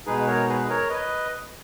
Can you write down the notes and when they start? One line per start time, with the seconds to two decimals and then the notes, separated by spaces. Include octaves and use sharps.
0.06 B2 G#3 D#4 G#4 B4
0.27 A#4 C#5
0.49 G#4 B4
0.69 A#4 C#5
0.90 B4 D#5